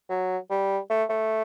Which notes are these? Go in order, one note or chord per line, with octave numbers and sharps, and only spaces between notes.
F#3
G3
A3
A3